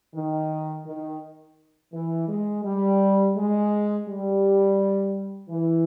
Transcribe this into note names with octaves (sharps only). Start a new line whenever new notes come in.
D#3
D#3
E3
G#3
G3
G#3
G3
E3